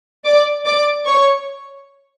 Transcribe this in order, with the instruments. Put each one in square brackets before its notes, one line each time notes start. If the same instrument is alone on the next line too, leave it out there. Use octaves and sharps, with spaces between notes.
[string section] D5 D6
D5 D6
C#5 C#6